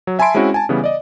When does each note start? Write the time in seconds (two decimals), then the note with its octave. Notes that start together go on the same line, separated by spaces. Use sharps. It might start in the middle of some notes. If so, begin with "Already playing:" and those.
0.07 F#3
0.19 E5 G#5 A5 B5 C6 D7
0.35 G#3 C4 C#4 E4 F#4
0.54 G#5 A5
0.69 C#3 E3 G3 B3
0.84 D5 D#5